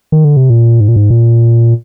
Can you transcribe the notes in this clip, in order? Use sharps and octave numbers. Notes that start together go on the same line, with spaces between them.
D#3
D3
C3
A#2
G#2
A#2
G#2
A#2